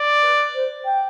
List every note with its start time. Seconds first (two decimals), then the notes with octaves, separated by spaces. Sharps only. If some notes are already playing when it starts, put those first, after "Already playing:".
Already playing: D5
0.23 B4
0.54 C5
0.85 G5